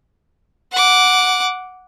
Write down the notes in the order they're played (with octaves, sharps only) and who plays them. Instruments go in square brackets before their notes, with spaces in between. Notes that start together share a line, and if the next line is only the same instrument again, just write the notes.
[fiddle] F#5 D6